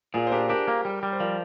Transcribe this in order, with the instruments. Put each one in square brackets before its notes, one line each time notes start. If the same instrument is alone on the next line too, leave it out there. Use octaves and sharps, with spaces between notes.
[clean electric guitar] A#2 [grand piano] F4 G#4
[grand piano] C5
[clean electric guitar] D4 [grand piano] G4 A#4
[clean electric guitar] D4 [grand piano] G4 A#4
[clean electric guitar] A#3
G3
G3
[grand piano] C5
[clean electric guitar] F3 [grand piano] A#4 D5